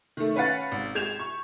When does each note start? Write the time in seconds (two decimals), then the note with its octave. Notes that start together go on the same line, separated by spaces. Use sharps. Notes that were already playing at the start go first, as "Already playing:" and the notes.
0.17 D#3 A3
0.36 C#4 B4 F5 F#5 A6
0.71 G#1
0.95 G#3 G6 G#6 E7 F7
1.19 C#6